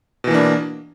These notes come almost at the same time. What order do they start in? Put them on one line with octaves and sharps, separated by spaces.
B2 E3 A#3 D4